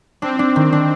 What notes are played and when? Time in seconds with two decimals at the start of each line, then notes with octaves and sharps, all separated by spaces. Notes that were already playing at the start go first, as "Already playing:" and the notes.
0.22 C4 D4
0.39 D4
0.56 D#3
0.73 D4